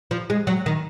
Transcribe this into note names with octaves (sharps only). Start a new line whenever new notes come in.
F3
G#3
F#3
D#3